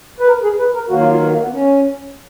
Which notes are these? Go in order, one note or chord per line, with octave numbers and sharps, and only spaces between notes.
B4
A#4
G#4
B4
A#4
D#3 F#3 A#3 F#4
F4
F4
B3
A#3
B3
C#4